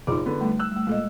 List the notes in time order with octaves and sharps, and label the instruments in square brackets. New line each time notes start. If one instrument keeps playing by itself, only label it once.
[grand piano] F#1 D6 [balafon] D#4 F4 G#4
[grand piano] D3 B3
[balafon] G3 A3
[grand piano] E6 F#6
[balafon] G3 A3
[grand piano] A#2 [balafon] G#3 A4 D#5